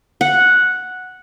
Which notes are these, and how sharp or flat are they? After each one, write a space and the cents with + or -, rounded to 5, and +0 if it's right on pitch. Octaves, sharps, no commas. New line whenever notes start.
F#5 -5